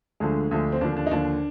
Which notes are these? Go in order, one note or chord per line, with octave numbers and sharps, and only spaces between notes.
D2 D3 F3 G#3
D2 D3 F3
C4
D#2 D3 F3 D4
D4
D#4
D#2 D3 F3 D4